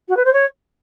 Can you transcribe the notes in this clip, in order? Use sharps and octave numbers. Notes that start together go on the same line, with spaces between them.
F#4
B4
C5
C#5